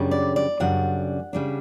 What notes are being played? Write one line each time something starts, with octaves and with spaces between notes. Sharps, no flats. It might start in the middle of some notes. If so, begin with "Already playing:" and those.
Already playing: F#2 C#3 G3 D4
D5
D5
F#2 C#3 G3 D4 F#5
C#3 G3 D4